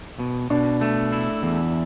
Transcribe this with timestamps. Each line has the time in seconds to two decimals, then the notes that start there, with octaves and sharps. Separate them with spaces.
0.19 B2
0.50 B2 D4
0.81 A3
1.12 E4
1.43 E2